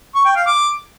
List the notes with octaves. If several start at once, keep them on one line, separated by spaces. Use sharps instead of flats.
C#6
G5
F5
D6